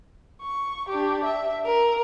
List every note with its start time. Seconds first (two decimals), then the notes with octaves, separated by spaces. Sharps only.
0.42 C#6
0.89 D4 G4
1.25 E5
1.66 A#4